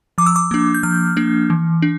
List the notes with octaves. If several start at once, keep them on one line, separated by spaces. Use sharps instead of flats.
F3 D6
E6
D6
A#3 D4
G6
F3 F6
A#3 D4
E3
D4